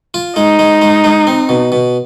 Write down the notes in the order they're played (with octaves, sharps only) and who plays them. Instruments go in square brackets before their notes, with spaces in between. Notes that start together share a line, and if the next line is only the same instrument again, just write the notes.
[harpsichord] F4
[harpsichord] G#3 [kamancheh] D#4
[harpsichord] G#3
G#3
G#3
C4
B2
B2